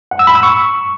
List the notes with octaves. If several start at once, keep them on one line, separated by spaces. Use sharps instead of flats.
F#5
E6
B5
E6
C#6